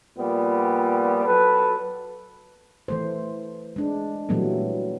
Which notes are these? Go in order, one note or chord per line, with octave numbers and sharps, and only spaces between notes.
A#2 F3 G3 B3
F#3 A4 B4
E3 A3 C5
G#3 D4
A#2 E3 F#3 G3 A3 B3